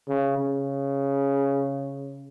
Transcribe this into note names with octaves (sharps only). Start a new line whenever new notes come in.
C#3
C#3